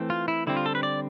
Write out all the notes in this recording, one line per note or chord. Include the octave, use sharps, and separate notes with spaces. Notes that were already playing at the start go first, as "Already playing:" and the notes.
Already playing: E3 A3 C4
F4
E4
D3 G3 C4 E4
F4
A4
B4
D5